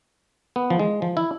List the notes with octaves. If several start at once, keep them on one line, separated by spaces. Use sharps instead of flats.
B3
F3
G#3
F3
E4